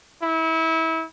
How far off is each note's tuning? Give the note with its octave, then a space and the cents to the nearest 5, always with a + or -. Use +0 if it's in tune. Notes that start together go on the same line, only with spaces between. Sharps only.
E4 -30